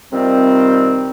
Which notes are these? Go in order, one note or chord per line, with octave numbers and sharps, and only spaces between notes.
C3 D#3 F3 G3 C4